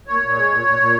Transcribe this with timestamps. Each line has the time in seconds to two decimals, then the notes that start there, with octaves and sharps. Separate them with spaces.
0.07 A#2 C#5
0.21 A#2
0.35 G#3
0.50 A#2
0.65 A#2
0.79 A#2